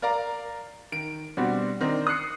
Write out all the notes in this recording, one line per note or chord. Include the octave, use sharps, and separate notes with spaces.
A#4 D5 F5 A#5
D#3 D7
B2 G3 C4 D4 F#4
D#3 C4 D4 D#4
D#6 F#6 C7 C#7